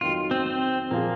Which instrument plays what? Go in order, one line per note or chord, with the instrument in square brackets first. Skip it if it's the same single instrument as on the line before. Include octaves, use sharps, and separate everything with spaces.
[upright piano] F2 D#3 F#3 [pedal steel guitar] F4
[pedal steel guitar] C4
C4
[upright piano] A#2 F3 C4 F4 G#4 [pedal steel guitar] A#3